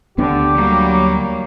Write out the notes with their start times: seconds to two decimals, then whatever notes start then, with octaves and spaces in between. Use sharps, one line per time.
0.18 D2 D3 B3 D4 G4
0.55 F#3 G3 A#3